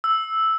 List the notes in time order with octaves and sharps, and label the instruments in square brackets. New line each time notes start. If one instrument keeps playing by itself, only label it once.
[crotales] E6